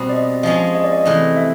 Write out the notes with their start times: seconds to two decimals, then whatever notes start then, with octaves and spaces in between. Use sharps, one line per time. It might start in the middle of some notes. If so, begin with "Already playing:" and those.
Already playing: B2 G3 C4
0.09 D5
0.12 D#5
0.43 F3 G#3 C#4 D#5
0.75 D#5
0.84 D5
0.93 D#5
1.05 C3 E3 A3 D#5
1.37 E5